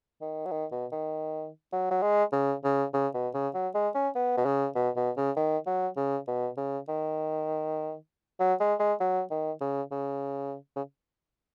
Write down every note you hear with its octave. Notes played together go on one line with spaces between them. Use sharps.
D#3
F#3
D#3
B2
D#3
F#3
F#3
G#3
C#3
C#3
C#3
B2
C#3
F#3
G#3
C#4
B3
B2
C#3
B2
B2
C#3
D#3
F#3
C#3
B2
C#3
D#3
F#3
G#3
G#3
F#3
D#3
C#3
C#3
C#3